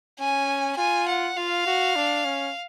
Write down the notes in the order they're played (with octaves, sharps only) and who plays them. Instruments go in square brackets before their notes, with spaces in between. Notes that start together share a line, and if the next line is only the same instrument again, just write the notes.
[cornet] C#4 [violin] G#5
[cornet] F4 [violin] G#5
[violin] F#5
[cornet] F4 [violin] F5
[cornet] F#4
D4
C#4